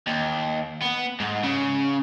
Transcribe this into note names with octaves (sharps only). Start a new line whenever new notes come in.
D#2
B3
G#2
C#3